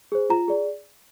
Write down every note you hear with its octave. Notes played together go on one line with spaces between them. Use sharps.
G#4 C5
F4 A#5
G#4 D5